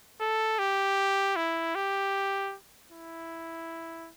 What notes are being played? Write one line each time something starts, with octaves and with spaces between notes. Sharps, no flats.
A4
G4
E4
G4
E4